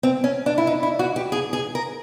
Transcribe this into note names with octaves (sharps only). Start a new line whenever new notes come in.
C4
C#4
D4
E4
D#4
E4
F#4
G4
G#4
G#4
A#4